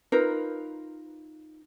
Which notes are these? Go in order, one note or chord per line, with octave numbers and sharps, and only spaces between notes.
D#4 F4 A#4 B4